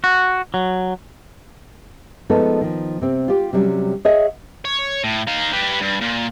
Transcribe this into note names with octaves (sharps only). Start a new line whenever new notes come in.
F#4
F#3
F3 G#3 A3 B3 D#4 A4
D#3 F3
C3 C4
F4 G4
C3 F#3 G3 C#4
G#4 C#5 D#5 E5 F#5
C#5
A2
D#4 F5
G4 B4
G2
A#2